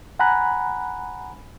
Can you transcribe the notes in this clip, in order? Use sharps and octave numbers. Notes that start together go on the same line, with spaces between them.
F#5 G#5 A#5 B5 F#6